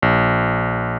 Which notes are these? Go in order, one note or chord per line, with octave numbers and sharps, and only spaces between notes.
A#1